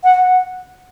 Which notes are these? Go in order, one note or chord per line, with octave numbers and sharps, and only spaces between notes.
F#5